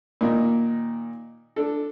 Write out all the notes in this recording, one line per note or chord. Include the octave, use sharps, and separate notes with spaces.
A#2 D#3 D#4
D4 A4